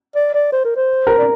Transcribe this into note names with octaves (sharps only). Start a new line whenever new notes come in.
D5
D5
C5
A#4
C5
A#4
D5